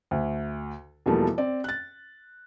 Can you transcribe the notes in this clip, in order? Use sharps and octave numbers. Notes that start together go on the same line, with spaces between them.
D2
E2 B2 F3 G3 A3 A#3
C4 D5
F#6 A6